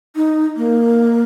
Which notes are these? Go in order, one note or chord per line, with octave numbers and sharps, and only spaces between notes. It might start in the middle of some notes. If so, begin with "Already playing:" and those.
D#4
A#3